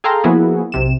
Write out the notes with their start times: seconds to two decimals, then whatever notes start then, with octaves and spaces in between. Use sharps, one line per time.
0.04 G#4 A4 F5 G5 A#5 C6
0.24 F3 A#3 B3 E4 F#4 G#4
0.72 B1 C3 E7